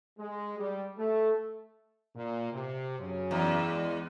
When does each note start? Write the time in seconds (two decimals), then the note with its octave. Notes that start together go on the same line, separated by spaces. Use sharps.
0.18 G#3
0.58 G3
0.98 A3
2.15 A#2
2.52 C3
2.99 F#2 C#3 C#4
3.31 E2
3.72 G#3